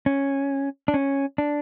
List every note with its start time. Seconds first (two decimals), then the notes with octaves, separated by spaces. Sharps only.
0.06 C#4
0.88 D4
0.94 C#4
1.38 D4